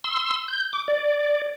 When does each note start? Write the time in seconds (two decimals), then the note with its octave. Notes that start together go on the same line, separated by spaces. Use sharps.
0.04 C6 E6
0.48 G6
0.73 D6
0.88 D5